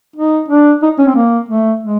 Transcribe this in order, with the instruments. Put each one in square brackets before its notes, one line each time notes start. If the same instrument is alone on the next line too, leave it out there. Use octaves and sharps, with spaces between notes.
[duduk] D#4
D4
D#4
C#4
C4
A#3
A3
G#3